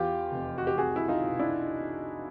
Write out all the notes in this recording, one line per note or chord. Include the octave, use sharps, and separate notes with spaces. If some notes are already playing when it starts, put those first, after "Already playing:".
Already playing: E2 F4 G4
F1
F#4
G4
C2 F#4 G#4
E4
D#4 F4
B2
D4 E4